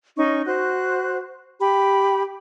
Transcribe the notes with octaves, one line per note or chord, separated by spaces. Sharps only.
C#4 D#4 C#6
F#4 C5 F#6
G4 B5